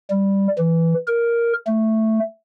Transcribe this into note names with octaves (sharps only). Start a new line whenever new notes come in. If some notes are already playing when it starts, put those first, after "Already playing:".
G3
E3
A#4
A3